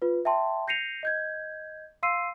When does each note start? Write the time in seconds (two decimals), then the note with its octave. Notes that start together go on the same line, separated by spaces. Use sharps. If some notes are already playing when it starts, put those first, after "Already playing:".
0.02 F4 B4
0.25 E5 G5 A5 C6
0.68 G6 A#6 C7 C#7 D#7 F7
1.03 D#5 G6 G#6
2.03 F5 C6 E6 C7 D#7